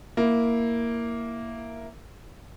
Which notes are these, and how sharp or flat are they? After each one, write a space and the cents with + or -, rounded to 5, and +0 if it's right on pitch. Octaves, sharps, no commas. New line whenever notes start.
A#3 +0 E4 +0